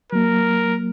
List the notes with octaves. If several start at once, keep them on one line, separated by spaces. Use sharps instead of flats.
F#3 A#3 A#4